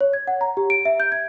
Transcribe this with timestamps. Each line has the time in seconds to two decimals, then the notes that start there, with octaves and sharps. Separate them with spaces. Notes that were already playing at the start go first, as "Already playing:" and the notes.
0.01 C#5
0.13 G#6
0.28 F#5
0.41 A#5
0.57 G4
0.70 D7
0.85 E5
1.00 G6
1.12 G#6